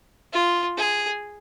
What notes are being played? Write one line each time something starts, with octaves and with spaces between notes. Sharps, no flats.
F4
G#4